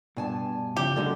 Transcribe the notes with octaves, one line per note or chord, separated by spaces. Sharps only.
G2 B2 G#5 A5
C#3 F3 G4
D3 F#3 G#3 F#4